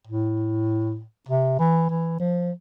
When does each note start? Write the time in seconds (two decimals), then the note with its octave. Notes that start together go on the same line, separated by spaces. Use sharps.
0.07 A2
1.29 C3
1.59 E3
1.90 E3
2.20 F3